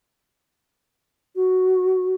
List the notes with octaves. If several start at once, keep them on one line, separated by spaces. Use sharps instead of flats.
F#4